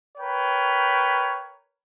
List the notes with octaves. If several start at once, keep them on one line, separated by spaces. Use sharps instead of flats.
A#4 B4 C#5 G5